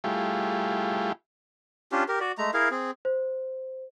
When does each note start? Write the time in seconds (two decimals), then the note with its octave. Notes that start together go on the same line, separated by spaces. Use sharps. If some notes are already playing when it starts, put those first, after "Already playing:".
0.04 G3 A3 E4 F4 G4 G#4
1.92 C#4 D4 F4 G4
2.08 G4 A#4
2.20 F#4 D5
2.38 G#3 A3 A#5
2.54 E4 G#4 A#4 F5
2.71 C4 G#4
3.05 C5